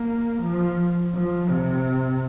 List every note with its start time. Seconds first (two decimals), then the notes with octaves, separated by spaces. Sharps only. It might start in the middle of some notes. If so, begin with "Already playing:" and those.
Already playing: A#3
0.42 F3
1.14 F3
1.50 C3